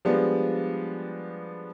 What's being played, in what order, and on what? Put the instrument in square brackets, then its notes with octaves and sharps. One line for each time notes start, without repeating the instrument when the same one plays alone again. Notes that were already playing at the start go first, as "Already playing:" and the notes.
[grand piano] F3 G3 G#3 B3 D4